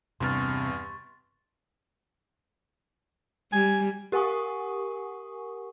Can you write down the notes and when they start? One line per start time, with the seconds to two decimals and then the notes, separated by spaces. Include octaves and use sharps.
0.20 E2 G2 C3 C6 C#6 F6 A6
3.52 G3 G#5
4.12 G4 A#4 F#5 G#5 C#6 D#6